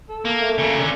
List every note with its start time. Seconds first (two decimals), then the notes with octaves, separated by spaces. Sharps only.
0.09 A4
0.25 A#3
0.41 A3
0.58 C#3 A#3
0.79 D3 C#4